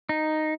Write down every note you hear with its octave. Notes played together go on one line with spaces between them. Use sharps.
D#4